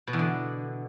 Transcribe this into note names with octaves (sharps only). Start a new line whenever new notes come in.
B2
E2
D3